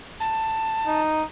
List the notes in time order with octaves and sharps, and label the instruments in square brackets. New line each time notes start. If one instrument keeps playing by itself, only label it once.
[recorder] A5
[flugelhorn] D#4